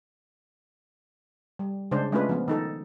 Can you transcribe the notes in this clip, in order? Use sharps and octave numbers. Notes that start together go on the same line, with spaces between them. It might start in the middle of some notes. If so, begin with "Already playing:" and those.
G3
C#3 G#3 D4 C5
G#3 A3 C#4 D4 F4 B4
F3 B3
D#3 D#4 A4